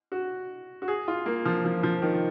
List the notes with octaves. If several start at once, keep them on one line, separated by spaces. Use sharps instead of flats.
F#4
F#4
G#4
F4
A#3
F3
F3
F3
D#3